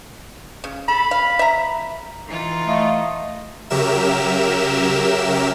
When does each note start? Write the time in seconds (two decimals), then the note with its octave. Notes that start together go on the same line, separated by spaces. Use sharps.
0.64 C#3
0.88 A4 B5
1.11 F5
1.39 E5 A#5
2.27 E3 D#4 F4
2.67 A3 D#5 F5
3.70 C#3 F#3 G4 A#4 E5 E7